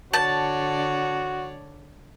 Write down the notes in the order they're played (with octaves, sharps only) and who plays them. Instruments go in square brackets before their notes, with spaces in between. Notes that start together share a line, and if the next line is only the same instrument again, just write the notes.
[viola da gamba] D3 C#5 D5 [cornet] F#4 [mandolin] A5